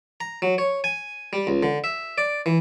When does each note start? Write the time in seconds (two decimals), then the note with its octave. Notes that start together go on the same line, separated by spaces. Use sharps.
0.20 A#5
0.42 F#3
0.58 C#5
0.84 G#5
1.33 G3
1.47 C#2
1.63 D3
1.84 E5
2.18 D5
2.46 E3